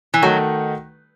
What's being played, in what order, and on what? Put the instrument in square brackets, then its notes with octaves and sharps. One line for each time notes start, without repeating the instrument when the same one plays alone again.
[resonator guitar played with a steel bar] E3
[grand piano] D#3 A3 D#4 F#4 A4 [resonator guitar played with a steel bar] F#3